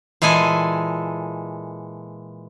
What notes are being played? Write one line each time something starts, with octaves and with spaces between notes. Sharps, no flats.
A#2 E3 G#3 A4 G#5